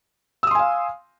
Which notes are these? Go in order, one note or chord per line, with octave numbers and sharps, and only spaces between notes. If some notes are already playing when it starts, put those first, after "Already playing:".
F5 G#5 C6 D#6 E6